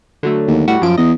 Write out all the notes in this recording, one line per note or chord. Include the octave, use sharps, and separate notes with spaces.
D3 F#3 A3
D#2
A2 G3 F#4
F#2 F3 D7
E2 D#5